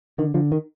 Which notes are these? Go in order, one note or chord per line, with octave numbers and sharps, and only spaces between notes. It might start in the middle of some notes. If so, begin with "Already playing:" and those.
D3 D#3
D3 F3
D#3